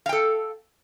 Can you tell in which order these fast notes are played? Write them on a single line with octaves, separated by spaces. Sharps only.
F5 G5 A4